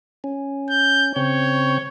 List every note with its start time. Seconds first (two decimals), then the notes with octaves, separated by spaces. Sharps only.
0.24 C#4
0.70 G6
1.16 C#3 C4 C#5 G6